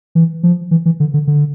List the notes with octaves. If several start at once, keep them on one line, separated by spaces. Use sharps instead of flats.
E3
F3
E3
E3
D3
D3
D3